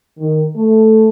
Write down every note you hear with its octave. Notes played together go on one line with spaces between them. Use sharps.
D#3
A3